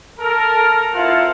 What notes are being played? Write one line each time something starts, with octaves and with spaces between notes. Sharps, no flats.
A4 A#4
C4 E4 F4 A#4 F#5 A5